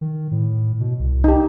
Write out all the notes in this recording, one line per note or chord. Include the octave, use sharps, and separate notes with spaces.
D#3
A2
B2
C2
D#4 G4